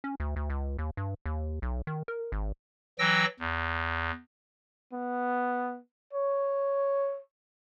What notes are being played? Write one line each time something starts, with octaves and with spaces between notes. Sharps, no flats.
C#4
D2
D2
C#2
D#2
G2
D#2
B1
D#3
A#4
G#1
E3 F#3 G5 E6 A#6
E2
B3
C#5